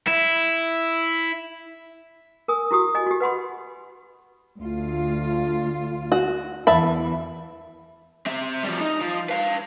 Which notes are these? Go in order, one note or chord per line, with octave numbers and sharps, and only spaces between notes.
E4
A#4 G#5 D#6
E4 F#4 G4 D#6
D#5 G#5
F#4 G4
B4 F#5 B5 C6
D2 F4
F#4
E2 E3 E5 A5 B5
C4 E5
F3 G3
D#4
F3
B4 F5